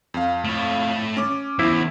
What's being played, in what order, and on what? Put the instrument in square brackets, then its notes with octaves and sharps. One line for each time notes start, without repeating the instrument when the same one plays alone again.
[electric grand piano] F2 F5
[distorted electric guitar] A3 C#5
[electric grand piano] C#4 D6
[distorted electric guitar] E2 [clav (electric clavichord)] E4 C5